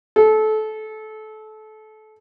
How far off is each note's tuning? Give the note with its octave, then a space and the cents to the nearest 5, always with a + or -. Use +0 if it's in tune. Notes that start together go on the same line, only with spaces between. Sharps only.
A4 -25